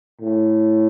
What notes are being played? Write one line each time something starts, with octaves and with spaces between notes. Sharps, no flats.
A2